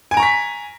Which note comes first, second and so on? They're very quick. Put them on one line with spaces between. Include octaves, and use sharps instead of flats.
G#5 D7 A#5 C#6 B6